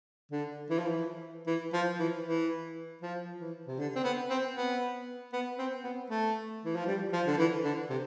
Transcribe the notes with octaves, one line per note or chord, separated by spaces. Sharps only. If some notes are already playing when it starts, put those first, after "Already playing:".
D3
E3
F3
E3
E3
F3
E3
E3
F3
E3
C3
D3
C4
B3
C4
B3
B3
C4
B3
A3
E3
F3
G3
F3
D3
E3
D3
C3